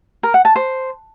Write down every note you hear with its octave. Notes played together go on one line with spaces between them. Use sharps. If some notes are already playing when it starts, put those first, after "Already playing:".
A#4
F#5
A5
C5